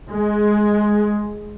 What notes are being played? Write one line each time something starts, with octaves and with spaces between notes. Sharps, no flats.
G#3